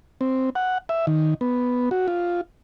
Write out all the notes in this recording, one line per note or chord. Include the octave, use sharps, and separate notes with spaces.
C4
F#5
E5
D#3
B3
F#4
F4